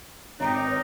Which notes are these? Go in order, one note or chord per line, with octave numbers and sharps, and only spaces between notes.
G#1 D#4 G4 A#4 C#5 D5 A#5
D6
B4 C#5